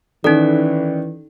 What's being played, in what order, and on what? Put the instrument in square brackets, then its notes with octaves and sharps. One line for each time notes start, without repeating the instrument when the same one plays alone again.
[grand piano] D#3 [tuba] E3 [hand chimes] C#4 D5 [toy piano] D#4 A4